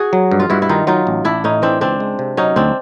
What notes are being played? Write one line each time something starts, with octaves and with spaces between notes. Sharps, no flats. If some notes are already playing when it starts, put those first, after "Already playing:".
Already playing: F#4 G#4
F#3
G2
F4
G2 E4 F#4
E4
D#3 D#4 F4
F#3 D#4 F4
A1
A1 D4 E4
A2 C#4 D#4
E3 C4 D4
C#2 C4 D4
G#3
C3
F#3 C#4 D#4
D2 C4 D4